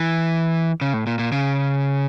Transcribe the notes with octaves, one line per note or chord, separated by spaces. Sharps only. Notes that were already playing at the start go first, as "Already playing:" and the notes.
Already playing: E3
C#3
A2
A#2
A#2
C#3